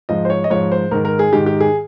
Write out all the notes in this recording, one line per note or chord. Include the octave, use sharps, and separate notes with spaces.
G#2 F3 D#5
C5
C#5
D#5
G#2 F3 C#5
C5
G#2 D#3 A#4
A#4
G#4
G#2 D#3 G4
G4
G#4